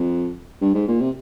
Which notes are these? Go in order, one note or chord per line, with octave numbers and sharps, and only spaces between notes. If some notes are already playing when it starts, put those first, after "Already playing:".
Already playing: F2
G2
G#2
A#2
C3